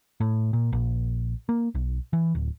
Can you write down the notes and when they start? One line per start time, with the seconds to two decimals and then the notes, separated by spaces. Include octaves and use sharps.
0.20 A2
0.53 A#2
0.73 A#1
1.49 A#3
1.75 B1
2.13 E3
2.35 D1